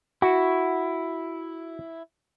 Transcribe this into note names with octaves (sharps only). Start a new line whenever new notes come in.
E4 F#4